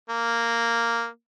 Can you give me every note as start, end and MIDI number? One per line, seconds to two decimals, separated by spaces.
0.10 1.08 58